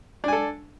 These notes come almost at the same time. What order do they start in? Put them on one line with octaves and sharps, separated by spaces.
D4 G#5 A4